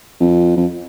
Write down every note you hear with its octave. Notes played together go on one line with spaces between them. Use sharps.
F2
F2